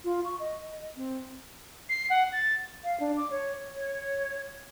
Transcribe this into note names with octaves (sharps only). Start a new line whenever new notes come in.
F4
C#6
D#5
C4
C7
F#5
A6
F5
D4
D6
C#5
C#5